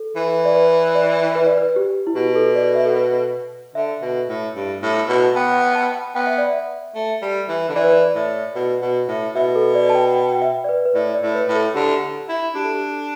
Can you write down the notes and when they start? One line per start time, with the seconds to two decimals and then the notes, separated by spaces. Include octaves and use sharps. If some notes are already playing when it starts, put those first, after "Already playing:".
Already playing: A4
0.16 E3
0.45 D5
0.56 B4
0.95 D5
1.36 B4
1.46 D5
1.58 B4
1.76 G4
2.07 E4
2.15 B2 G4
2.35 A4
2.56 D5
2.75 E5
2.85 A4
2.96 B4
3.75 D3 E5
4.02 B2
4.29 A2
4.56 G2
4.82 A2
5.08 B2
5.23 A5
5.35 B3 G5
5.66 G5
5.75 A5
6.15 B3 G5
6.27 E5
6.38 D5
6.50 E5
6.95 A3
7.22 G3
7.49 E3
7.69 D3
7.75 E3 D5
7.84 B4
7.93 D5
8.15 A2
8.55 B2
8.82 B2
9.08 A2
9.35 B2 E5
9.56 A4
9.75 D5
9.90 A5
9.95 G5
10.16 G5
10.35 G5
10.42 E5
10.64 D5
10.69 B4
10.85 B4
10.95 A2 D5
11.15 D5
11.22 A2
11.35 B4
11.49 A2
11.55 A4
11.75 D3 G4
12.29 E4
12.55 D4 G4
12.64 A4
12.74 G4